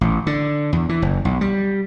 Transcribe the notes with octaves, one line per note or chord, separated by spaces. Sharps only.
A1
D3
E2
E3
F#1
B1
G3